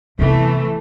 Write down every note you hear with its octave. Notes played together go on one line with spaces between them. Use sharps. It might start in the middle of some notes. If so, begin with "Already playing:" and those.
C3 E3 A3 B3